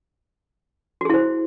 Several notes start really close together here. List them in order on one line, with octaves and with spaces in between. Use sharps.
F#4 G#4 E4 C5